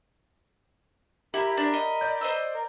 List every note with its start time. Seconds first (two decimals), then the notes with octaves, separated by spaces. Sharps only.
1.34 E4 G4 A#4 B5
1.57 D4
1.74 D#5
2.01 D5 G6
2.21 C5 D#5 E6
2.54 A#4